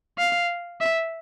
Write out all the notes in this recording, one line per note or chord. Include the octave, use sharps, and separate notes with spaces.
F5
E5